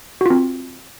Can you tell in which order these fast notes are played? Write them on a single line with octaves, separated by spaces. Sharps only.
F#4 F4 C4